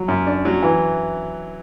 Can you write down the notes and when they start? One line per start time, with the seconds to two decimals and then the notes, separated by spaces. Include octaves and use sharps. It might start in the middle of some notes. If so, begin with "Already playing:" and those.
Already playing: F#3
0.08 F#2
0.27 D4
0.45 F#3
0.63 E3